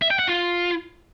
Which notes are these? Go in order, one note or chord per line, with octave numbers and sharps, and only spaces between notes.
E5
G5
F#5
F4